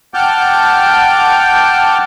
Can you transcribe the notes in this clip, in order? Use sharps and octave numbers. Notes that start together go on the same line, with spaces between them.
F#5 G5 A5 D6 F6 G6